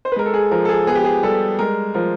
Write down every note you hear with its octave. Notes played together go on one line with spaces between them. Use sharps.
C5
B4
G#3 A#4
A4
G#4
F3 A#4
A4
G#4
B3 G#4
G4
G#4
G3 A4
G#3 A#4
F3 A#4